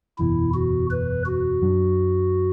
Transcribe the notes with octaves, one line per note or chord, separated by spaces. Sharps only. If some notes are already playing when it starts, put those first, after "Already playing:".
F#1 E2 B2 E4
F#4
B4
F#4
F#2 F#3 D4